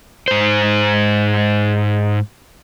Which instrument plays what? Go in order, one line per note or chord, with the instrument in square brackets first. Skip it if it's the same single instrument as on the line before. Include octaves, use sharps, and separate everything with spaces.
[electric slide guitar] G#2 C5